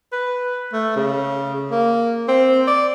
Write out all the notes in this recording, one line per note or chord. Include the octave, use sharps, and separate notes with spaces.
B4
A3
C#3
A#3
C4
D5